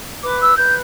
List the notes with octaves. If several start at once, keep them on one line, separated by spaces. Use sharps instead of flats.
B4 D6
E6
B4 G6